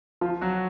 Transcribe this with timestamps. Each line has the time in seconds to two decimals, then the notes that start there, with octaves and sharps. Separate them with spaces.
0.21 F3 F4
0.41 F#3 F#4